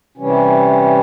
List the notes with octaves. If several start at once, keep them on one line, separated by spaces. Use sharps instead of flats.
C3 E3 G3 C#4